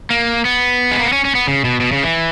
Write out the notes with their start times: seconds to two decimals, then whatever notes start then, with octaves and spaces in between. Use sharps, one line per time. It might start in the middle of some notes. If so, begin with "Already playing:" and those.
0.11 A#3
0.45 B3
0.92 G#3
0.99 A#3
1.05 B3
1.13 C#4
1.25 C#4
1.35 B3
1.48 C#3
1.65 B2
1.80 B2
1.92 C#3
2.04 E3